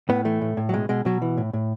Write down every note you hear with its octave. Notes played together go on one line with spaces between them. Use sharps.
A2 B3
E3 A3
A2
A2
F#3
B2 G#3
B2 G#3
B2 F#3
E3
A2
A2